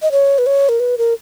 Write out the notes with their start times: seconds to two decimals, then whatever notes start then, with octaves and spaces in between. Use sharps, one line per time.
0.02 D#5
0.12 C#5
0.38 B4
0.46 C#5
0.69 A#4
0.80 B4
0.98 A#4